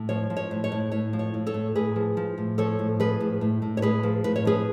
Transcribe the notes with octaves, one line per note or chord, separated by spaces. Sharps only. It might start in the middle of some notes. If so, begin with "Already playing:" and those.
Already playing: A2
F3 C#5
F3
C#5
A2
C#5
A2
A2 C#5
F3
C#5
A2
A4 C#5
A2
A2 G#4 B4
F3
F3
A2
F3 A4 C#5
A2
F3 G#4 B4
A2
A2
A2
C#5
A2 G#4 B4
F3
A2 B4
C#5
F3 G#4 B4